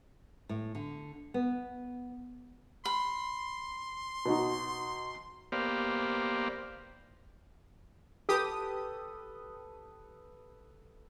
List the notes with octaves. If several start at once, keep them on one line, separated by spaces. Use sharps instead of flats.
A2
D3
B3
B5 C6
B2 D#4 F#4
A#3 B3 G4 C5 D5 F5
G4 A4 B4 D#6